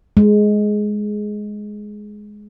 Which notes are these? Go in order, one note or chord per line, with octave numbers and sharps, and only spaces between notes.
G#3